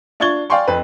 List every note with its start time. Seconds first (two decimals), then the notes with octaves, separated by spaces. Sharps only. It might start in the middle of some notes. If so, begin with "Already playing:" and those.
0.20 D4 F4 C#6 G#6 A6 G7
0.50 D5 F5 G5 G#5 C6 C#6
0.68 F2 B4